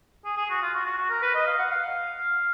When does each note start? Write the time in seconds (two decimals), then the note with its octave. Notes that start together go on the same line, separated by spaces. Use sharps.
0.25 G#4
0.37 G#4
0.50 F#4
0.62 F4
0.74 F#4
0.85 F#4
0.97 F#4
1.10 A#4
1.22 B4
1.35 D#5
1.47 F5
1.58 F#5
1.71 F5